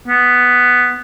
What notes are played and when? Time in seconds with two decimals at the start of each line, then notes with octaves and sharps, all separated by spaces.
0.07 B3